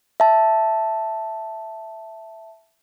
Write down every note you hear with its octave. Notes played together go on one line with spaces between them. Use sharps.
E5 A5